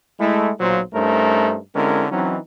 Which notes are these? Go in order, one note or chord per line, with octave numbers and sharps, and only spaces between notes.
G#3 A3 E4
B1 A#2 F#3 A#3 F4 C5
G2 A3 C#4 D#4 A#4 C5
D3 G#3 C4 C#4 E4 A#4
E3 F#3 C4 C#4 D#4